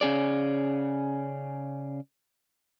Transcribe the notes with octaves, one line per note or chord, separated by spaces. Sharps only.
C#3 C#4 G#4 D5